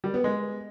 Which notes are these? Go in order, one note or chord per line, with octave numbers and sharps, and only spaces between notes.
G3
B3
G#3